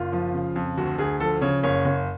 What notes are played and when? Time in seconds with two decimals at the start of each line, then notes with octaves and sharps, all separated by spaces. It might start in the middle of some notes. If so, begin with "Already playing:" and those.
Already playing: F#1 F4
0.13 F3
0.34 C#3
0.56 F2
0.78 D2 F#4
0.98 D2 G#4
1.20 F3 A4
1.41 C#3 C#5
1.63 F#1 C#5
1.85 F#1